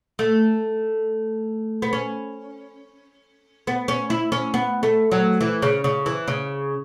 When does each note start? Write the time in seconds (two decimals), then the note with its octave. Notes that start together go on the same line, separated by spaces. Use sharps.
0.19 A3
1.82 B3
1.93 C#4
3.67 B3
3.88 C#4
4.10 E4
4.32 C#4
4.54 B3
4.83 A3
5.12 F#3
5.41 E3
5.62 C#3
5.84 C#3
6.06 E3
6.28 C#3